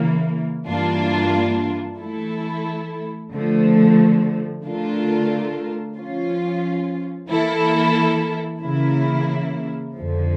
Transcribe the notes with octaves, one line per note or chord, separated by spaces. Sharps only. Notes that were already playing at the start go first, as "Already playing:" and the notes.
Already playing: C#3 E3 A#3
G2 E3 A#3 D4 F4
E3 A3 E4 A4
D3 F3 A3
D3 A3 D4 F4 A#4
F3 C#4 F4
E3 A#3 E4 A4
C#3 E3 A#3 E4
F2 D3 F3